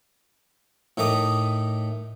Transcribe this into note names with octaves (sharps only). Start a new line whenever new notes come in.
A2 D#3 A3 A#5 D6 D#6